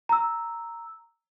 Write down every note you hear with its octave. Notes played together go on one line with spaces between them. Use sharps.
A#5 E6